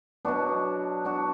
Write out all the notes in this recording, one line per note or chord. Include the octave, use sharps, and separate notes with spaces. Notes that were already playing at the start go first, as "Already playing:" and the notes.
B2 F#3 B3 D4 F#4
D4 F#4